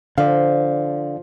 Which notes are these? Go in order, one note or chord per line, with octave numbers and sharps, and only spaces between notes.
D3 F3 D5 F5